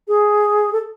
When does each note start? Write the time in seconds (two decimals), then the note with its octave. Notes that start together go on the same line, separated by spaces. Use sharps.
0.08 G#4
0.73 A4